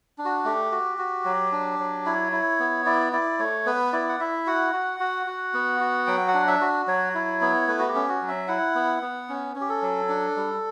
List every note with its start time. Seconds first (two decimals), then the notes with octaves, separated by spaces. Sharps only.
0.18 D4
0.25 F#4
0.45 A3 G4
0.71 F#4
0.98 F#4
1.25 F#3
1.52 D4
1.79 F#3
2.05 E4 C#5
2.32 E4
2.60 B3
2.86 E4 D5
3.13 E4 D5
3.39 A3 C#5
3.66 B3 B4
3.93 E4 D5
4.09 F#5
4.20 E4 E5
4.47 F#4 F#5
4.73 F#4
5.00 F#4
5.27 F#4
5.54 B3
5.80 F#4
6.07 F#3 G5
6.28 F#5
6.34 D4
6.47 E5
6.61 F#4
6.88 F#3 C#5
7.15 E4
7.41 B3
7.68 A3 B4
7.79 F#4
7.88 G4
7.95 C#4
8.09 F#4
8.22 F#3
8.28 E5
8.48 E4 F#5
8.75 B3
9.02 B3
9.29 C#4
9.55 C#4
9.61 G4
9.69 A4
9.82 F#3
10.09 D4
10.36 G3